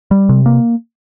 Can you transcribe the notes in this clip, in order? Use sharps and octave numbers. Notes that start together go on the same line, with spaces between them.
G3
C3
A#3